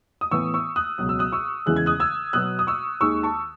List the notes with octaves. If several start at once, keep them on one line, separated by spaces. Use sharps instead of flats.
D#6
A2 E3 B3 C#6 E6
C#6 E6
D#6 F#6
C#2 B2 F#3 F#6
E6
D#6 F#6
C#6 E6
E2 C#3 E3 G#3 F#6
G#6
D#6 F#6
E6 G#6
B2 F#3 B3 D#6 F#6
D#6
C#6 E6
D#2 D#3 G#3 C#6 E6
A5 C#6